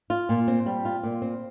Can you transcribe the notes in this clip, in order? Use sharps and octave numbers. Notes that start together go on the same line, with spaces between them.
F4
A#2
C4
G3
F4
A#2
C4